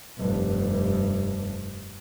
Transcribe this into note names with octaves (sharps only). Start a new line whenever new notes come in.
F1 G2